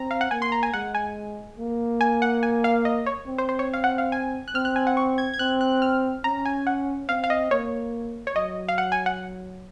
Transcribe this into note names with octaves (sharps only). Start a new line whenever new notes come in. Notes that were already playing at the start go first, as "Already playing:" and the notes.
Already playing: C4 A#5
F5
F#5
A#3 G#5
C6
A#5
G#5
G#3 F#5
G#5
A#3
G#5
F#5
G#5
F5
D#5
C#5
C4
C5
C5
C#5
F5
F#5
F5
G#5
F#6
C4 F6
F#6
G#5
F#5
C#6
G#6
G#6
C4 F#6
F#6
F6
C#4 A#5
G#5
F#5
C4 F5
F5
D#5
A#3 C#5
C#5
F#3 D#5
F5
F#5
G#5
F#5